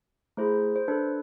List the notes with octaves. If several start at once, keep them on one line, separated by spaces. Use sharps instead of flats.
A3 E4 G#4 C5
C5
D4 A4 B4